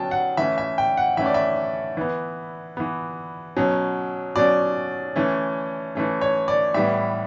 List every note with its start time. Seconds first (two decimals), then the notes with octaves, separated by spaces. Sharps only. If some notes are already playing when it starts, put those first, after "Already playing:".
Already playing: B2 F#3 C#4 G5 A5
0.11 F#5
0.37 E3 A3 C#4 E5
0.58 E5
0.78 G5
0.97 F#5
1.17 E3 A3 C#4 E5
1.26 D5
1.34 E5
1.97 E3 B3
2.77 E3 B3
3.56 B2 F#3 C#4
4.36 B2 F#3 C#4 D5
5.16 E3 A3 C#4
5.95 E3 A3 C#4
6.21 C#5
6.48 D5
6.74 A2 E3 G3 B3 E5